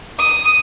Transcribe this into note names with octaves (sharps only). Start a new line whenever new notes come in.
D#6